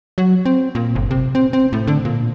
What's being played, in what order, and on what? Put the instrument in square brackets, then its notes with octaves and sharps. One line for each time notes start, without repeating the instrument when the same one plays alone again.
[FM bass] F#3
C4
A#2
G1
C3
C4
C4
A2
D3
A#2